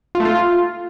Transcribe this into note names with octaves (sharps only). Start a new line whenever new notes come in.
F4
A3
F4